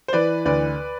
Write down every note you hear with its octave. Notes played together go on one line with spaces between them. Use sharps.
C5
E3 B4 D5
D2 B4 D5